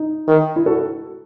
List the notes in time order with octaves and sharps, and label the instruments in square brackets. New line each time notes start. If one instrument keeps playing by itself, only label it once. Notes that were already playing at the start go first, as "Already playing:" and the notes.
Already playing: [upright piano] D#4
[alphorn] D#3
[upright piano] E4
F#4 A4